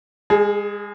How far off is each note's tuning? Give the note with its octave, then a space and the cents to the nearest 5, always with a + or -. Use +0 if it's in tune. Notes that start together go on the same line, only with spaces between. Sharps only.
G#3 -30 G#4 +20